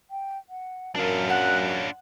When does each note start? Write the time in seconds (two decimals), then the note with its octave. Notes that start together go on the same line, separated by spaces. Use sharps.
0.11 G5
0.49 F#5
0.96 F#2 D4 F4 A#4
1.30 F#5 F#6
1.66 C#5